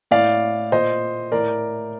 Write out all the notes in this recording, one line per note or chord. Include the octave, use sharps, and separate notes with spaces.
A2 D5 F5
A#2 C5 D#5
A2 A#4 D5